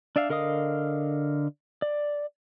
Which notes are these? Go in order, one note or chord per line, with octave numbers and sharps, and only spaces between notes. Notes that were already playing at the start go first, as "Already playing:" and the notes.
D4 D5 E5 F5
D3 A#4 D#5 F5 D#6
D5